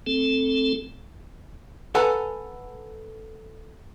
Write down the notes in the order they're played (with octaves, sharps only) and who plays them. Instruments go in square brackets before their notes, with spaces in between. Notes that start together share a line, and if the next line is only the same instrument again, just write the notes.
[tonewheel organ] A3 C4 A4
[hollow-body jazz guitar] A4 B4 F#5 G#5 A#5